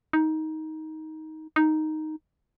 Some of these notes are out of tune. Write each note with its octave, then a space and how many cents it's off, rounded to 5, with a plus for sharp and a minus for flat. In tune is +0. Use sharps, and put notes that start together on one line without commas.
D#4 +15
D#4 +0